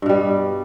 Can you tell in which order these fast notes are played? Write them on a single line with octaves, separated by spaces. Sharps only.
G2 B2 G3